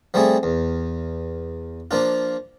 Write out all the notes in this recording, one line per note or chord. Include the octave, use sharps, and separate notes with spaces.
F3 G3 A3 C4 G#4
E2
F3 A#3 D4 F4